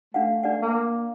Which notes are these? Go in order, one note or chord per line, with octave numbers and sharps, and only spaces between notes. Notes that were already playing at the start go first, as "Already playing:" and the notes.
A3 D4 F5 F#5
D4 D5 F#5
A#3